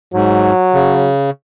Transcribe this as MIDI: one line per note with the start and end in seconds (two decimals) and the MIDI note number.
0.14 0.52 44
0.14 1.10 54
0.74 1.30 49